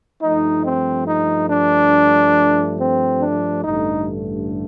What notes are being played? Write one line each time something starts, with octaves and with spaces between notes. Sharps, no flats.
G2 F3 A3 D#4
C4
D#4
D4
C4
D4
A1 G2 D3 A3 D#4